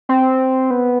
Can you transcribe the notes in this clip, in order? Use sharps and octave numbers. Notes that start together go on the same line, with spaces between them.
C4
B3